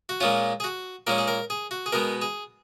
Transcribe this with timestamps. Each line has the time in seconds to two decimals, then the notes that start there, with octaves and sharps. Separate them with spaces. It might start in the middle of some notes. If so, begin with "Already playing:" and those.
0.09 F#4
0.20 A#2 G#3 C#4 F4
0.60 G#4
0.64 F#4
1.07 A#2 G#3 C#4 A#4
1.18 G#4
1.28 A#4
1.50 G#4
1.71 F#4
1.86 G#4
1.92 B2 G#3 B3 A#4
2.22 G#4